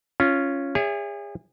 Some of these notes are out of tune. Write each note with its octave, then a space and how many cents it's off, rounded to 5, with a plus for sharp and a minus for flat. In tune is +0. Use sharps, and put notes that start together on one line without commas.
C#4 +0 F4 -10
G#4 -35 C#5 +30 E5 +5